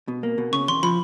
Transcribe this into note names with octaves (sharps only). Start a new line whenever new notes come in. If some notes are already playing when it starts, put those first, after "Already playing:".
B2
A#3
B2
C#3 C#6
E2 C6
F3 B5